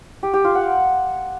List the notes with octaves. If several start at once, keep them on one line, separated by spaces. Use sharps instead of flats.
G4
G4
F4
F#5